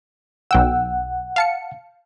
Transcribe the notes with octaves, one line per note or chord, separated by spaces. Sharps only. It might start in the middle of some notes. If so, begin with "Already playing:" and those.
B1 F#5 G5 E6
F5 A5 C#7